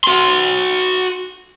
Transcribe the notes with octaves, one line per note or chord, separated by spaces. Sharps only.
F#4 C6